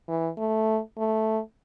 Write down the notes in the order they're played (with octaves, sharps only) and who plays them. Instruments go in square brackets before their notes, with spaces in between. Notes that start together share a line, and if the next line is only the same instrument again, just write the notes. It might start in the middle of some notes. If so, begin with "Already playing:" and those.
[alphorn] E3
A3
A3